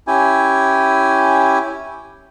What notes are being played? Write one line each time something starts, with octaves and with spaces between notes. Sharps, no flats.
C#4 E4 G4 G#5